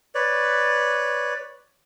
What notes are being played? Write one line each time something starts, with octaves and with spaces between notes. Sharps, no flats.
B4 C#5 D5